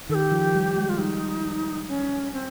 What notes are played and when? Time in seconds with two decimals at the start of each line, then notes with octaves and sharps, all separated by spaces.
0.10 D#3 A4
0.15 G4
0.32 F3
0.55 G3
0.77 G#3
0.89 F4
0.99 G3 D#4
1.88 C#4
2.33 C4